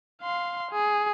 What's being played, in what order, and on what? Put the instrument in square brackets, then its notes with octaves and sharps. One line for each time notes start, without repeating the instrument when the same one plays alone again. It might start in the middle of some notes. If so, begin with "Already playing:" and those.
[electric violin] F5 C6
G#4